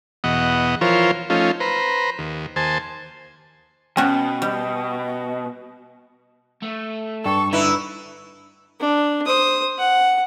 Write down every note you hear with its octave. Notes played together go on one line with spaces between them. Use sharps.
E2 B2 D#5 F#5
E3 F3 F4 A#4 C5 C#5
F3 A3 C#4 D#4 F4
B4 C5 A#5
D#2
D#2 C5 G#5 A5
B2 C#4 F#4 G5
G3 D#5
A3
G2 A4 C#6
D3 D#4 E4 B4
D4
C5 D#6
F#5